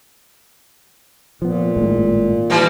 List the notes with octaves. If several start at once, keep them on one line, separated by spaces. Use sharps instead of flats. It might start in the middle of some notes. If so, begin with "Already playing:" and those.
A#2 F3 B3
G#1 A2 G#3
D#3 E3 G3